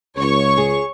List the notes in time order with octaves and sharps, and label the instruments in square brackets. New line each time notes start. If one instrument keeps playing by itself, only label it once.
[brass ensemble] C#2 [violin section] C#5 C#6
[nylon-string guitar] G#4